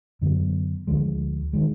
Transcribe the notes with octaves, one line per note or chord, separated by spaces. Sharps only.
F#2 D3 F#3 B3
D2 D3 F3 G#3
D#3 G#3